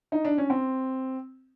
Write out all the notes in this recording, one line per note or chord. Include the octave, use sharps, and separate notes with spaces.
D#4
D4
C#4
C4